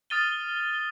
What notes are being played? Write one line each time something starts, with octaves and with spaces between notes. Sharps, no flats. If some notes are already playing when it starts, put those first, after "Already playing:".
D#6 F6 A6 D#7 G7